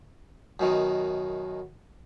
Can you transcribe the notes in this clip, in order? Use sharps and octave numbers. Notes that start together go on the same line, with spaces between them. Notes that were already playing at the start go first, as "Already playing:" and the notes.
F#2 B2 D#3